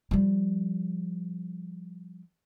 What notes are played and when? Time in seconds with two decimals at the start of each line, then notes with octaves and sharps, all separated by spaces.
0.11 F3 G3